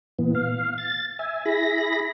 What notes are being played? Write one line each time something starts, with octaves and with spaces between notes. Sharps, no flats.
A#2 E3 B3
F5
A6
E5 G#5
E4 G#4 B5 A#6